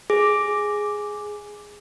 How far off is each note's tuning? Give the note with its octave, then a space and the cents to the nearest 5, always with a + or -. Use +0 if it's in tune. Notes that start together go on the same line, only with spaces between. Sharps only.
G#4 +0 D6 +0